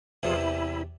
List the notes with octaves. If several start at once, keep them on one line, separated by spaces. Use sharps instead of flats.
E2 C3 E3 F3 F4 G#4
E4